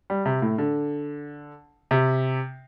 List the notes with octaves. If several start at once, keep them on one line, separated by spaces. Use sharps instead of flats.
G3
C3
A2
D3
C3